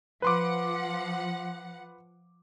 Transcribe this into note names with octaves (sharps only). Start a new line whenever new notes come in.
F3 B4 F#5 C6 D6